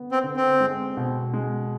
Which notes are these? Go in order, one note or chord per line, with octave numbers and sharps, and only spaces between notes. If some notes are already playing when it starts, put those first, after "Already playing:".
Already playing: D3 B3
C4
D3
C4
G#3
B2
G#3